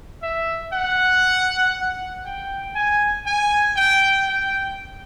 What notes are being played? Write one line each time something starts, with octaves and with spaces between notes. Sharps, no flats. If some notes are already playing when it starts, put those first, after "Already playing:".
E5
F#5
G5
G#5
G#5
G5
G5